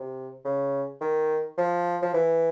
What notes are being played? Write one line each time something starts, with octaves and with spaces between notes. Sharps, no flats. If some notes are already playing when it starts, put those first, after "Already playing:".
Already playing: C3
C#3
D#3
F3
F3
E3